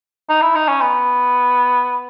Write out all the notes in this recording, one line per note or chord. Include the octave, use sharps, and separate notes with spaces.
D#4
E4
D#4
C#4
B3